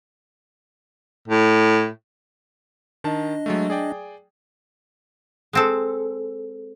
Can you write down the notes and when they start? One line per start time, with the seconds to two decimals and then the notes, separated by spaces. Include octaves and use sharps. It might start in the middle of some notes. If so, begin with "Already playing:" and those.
1.28 A2
3.04 D#3 D4 D#5 A5
3.46 F#3 G#3 A3
3.70 G#4 D5 G5
5.53 G#3 C4 A4